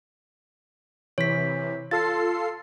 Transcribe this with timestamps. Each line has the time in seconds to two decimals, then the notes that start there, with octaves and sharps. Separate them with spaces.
1.18 C3 E3 C#5 B6
1.91 F4 A4 A6 C7